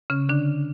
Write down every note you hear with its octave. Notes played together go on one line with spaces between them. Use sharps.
C#3 C#4
D3 D4